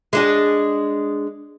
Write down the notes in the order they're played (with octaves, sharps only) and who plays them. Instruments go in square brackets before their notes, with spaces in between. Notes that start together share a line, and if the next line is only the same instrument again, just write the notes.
[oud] G#3 D4 G#4